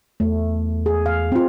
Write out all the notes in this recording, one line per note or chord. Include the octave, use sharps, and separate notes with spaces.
E2 A3
G#4
F5
C4 F4